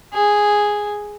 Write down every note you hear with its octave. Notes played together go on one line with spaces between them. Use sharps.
G#4